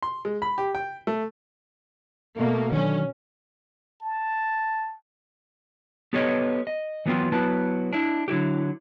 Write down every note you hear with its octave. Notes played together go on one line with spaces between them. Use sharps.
C6
G#3
B5
G4
G5
A3
B2 A3 A#3
D3 D#3 F#3 C#4
A5
B3 G4 A4 B4 C#5 D#5
D#5
E3 F#3 B3 C4 F4
F#3 B3 E4 B4 A5
D4 E4
D3 F#3 E4 G4